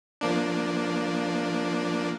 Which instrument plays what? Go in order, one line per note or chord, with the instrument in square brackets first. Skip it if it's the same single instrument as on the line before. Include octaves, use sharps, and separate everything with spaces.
[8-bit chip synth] F3 A#3 D4